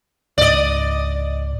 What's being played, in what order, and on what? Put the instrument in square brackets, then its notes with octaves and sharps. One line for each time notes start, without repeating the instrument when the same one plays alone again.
[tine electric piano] C#2 G#2 [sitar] D5 D#5